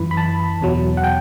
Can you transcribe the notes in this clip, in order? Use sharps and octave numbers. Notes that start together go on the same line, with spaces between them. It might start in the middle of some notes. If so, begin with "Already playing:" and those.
Already playing: F#2 E3 B5
B5
A5
E2 B2 F#3
F#5
G5